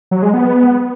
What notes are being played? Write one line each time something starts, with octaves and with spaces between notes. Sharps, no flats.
F#3
G#3
B3